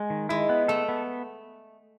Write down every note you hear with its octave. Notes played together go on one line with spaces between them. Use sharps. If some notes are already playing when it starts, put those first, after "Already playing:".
Already playing: G#3
D#3
G#3 E4
B3
A3 A4
B3